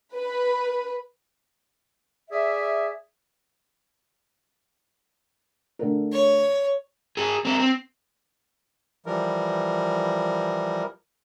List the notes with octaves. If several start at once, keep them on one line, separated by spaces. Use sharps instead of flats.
B4
G#4 D5 E5
D3 A3 A#4
C#5
G#4 A#4
C4 A#4
C4
E3 F3 G3 A#4